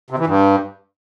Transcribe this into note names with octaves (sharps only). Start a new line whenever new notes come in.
C3
E3
G2